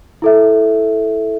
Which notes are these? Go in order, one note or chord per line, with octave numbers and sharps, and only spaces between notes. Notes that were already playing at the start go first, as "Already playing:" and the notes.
E4 A4 E5